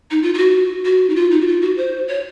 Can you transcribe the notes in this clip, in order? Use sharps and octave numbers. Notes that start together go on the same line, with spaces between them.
D#4
F4
F4
F#4
F#4
D#4
F4
D#4
F#4
F4
F#4
C5
C#5